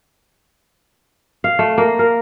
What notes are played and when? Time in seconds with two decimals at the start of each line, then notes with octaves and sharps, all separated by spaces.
1.44 F5
1.59 A3
1.78 A#3
1.99 A#4